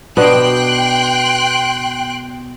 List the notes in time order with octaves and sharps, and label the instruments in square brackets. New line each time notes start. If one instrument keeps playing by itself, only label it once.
[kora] B2 B3 D4 [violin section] G5 C6 F#6